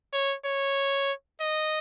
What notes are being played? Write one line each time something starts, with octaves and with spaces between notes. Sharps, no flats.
C#5
C#5
D#5